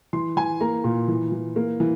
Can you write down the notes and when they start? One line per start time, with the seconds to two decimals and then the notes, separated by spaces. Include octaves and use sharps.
0.13 E3 C6
0.37 E3 G#5
0.61 A#3 A#5
0.84 A#2
1.08 E3
1.32 E3
1.56 A#3
1.80 E3